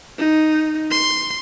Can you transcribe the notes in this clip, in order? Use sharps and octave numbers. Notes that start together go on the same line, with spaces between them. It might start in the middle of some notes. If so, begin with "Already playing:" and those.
D#4
C6